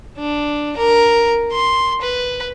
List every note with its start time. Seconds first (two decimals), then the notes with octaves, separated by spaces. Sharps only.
0.18 D4
0.76 A#4
1.52 C6
2.02 B4